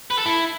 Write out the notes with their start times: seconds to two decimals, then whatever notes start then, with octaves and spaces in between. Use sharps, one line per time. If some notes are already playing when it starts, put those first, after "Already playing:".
0.10 B4
0.18 A4
0.26 E4